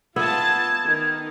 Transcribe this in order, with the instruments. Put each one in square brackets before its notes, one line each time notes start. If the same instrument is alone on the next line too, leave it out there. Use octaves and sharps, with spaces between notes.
[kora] B3 E5 [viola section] F4 A5 [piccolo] G#6
[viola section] D#3